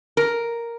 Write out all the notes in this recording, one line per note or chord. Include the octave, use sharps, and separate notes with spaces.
A#4